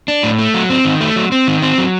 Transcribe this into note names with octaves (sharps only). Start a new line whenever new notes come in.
D4
A2
A3
F#3
C4
D#3
A3
F#3
C4
D#3
C4
F#3